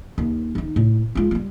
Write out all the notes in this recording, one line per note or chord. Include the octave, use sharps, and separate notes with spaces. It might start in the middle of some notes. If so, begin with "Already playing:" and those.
D#2
D#3 D#4
A2
G#3 F4
G3 G#3